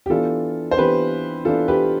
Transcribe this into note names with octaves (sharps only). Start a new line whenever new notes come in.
G4
E3 B3 D4 F4 A4
C5
E3 B3 D4 G4 B4
E3 B3 D4 F4 A4
G4 B4